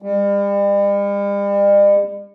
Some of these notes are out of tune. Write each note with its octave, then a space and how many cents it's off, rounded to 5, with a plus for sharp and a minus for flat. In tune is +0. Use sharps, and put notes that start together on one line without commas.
G3 +40